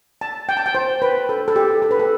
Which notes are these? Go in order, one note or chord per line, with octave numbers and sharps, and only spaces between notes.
A5
G5
A5
G5
C5
B4
A4
A4
G4
A4
B4
A4